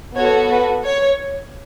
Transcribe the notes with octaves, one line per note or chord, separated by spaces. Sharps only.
B3 F#4 A4 C#5
B4
C#5